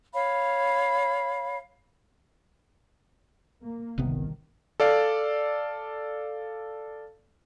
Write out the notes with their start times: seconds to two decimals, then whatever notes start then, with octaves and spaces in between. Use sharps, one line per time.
0.13 C#5 F5 B5
3.62 A#3
3.98 G1 C2 C3 D#3 B3
4.80 A4 D5 F5